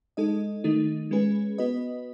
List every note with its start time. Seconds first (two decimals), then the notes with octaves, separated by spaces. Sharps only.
0.17 G#3 D#4 A4 D#5
0.64 D#3 A3 D#4
1.11 G#3 C#4 G#4 B4
1.58 B3 F#4 B4 D#5